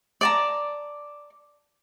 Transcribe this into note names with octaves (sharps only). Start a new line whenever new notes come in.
D5 A5 A#5